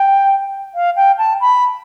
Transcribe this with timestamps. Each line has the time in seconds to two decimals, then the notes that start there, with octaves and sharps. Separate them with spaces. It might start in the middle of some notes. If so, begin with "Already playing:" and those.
Already playing: G5
0.75 F5
0.96 G5
1.18 A5
1.40 B5